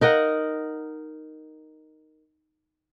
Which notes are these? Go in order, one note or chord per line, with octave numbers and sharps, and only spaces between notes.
D#4 A#4 D#5 F#5